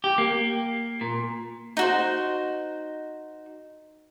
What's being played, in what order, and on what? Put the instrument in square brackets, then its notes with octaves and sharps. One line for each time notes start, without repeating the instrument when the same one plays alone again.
[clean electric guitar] G4
A#3
A#2
[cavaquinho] D#4 F#4 C5